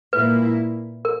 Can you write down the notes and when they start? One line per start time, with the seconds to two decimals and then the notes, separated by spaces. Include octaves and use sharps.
0.13 A#2 A#3 E4 B4
1.05 A#4